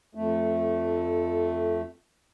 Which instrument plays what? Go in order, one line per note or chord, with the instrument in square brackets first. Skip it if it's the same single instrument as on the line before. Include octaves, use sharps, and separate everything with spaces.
[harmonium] F2 A3